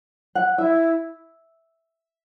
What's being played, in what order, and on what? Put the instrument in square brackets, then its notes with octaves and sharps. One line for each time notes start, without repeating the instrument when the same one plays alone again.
[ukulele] F#5
[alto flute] E4 [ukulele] E5